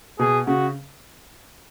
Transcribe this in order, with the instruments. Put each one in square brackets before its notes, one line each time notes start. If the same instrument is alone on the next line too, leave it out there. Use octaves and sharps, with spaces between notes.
[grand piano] B2 [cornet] G#4
[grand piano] C#3 [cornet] F#4